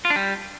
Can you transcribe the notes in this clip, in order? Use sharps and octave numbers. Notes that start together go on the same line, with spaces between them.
F4
D4
G3